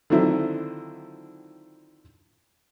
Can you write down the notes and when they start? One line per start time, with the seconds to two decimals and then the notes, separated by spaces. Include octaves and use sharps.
0.10 D3 D#3 F3 F#3 C4 E4